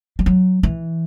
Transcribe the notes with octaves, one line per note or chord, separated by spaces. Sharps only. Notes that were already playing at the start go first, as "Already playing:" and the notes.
G3
F#3
E3